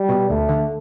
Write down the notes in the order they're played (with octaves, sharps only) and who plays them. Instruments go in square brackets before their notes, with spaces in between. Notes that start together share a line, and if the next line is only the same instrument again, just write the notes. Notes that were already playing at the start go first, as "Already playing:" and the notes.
Already playing: [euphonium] G3
[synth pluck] B2
[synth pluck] D2 [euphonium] A3
[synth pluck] D3